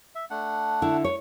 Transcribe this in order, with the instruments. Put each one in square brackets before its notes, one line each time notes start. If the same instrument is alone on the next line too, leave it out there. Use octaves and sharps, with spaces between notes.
[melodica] E5
A3 D4 F#5
[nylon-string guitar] D3 E4
C#5